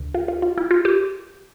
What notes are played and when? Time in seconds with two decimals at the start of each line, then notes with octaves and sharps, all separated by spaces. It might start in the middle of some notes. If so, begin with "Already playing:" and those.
Already playing: D2
0.14 F4
0.28 F4
0.42 F4
0.58 E4
0.71 F4
0.85 G4